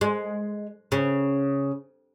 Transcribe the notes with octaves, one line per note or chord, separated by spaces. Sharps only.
G#3
C#3